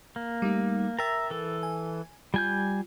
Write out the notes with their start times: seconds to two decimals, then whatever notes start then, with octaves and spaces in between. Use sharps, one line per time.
0.16 A#3
0.42 G3 A3 D#4
0.99 A#4 E5 G5 A#5 A6
1.31 E3 A4
1.63 G#5
2.34 G3 F4 G#5 G6